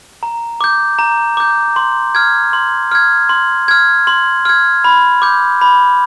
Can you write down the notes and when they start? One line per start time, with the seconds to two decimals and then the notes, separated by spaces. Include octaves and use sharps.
0.23 A#5
0.61 D6 G6
0.99 A#5
1.37 D6 G6
1.76 C6
2.15 F6 G#6
2.53 C6
2.91 F6 G#6
3.29 C6
3.68 F6 G#6
4.07 C6
4.45 F6 G#6
4.84 B5
5.22 D6 G6
5.61 B5